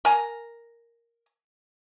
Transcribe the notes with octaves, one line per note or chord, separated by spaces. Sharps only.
A#4 G#5 A#5